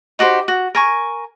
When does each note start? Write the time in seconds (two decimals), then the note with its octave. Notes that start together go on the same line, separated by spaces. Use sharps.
0.19 D#4 F#4 G4 C5
0.48 F#4
0.75 A#4 G#5 C#6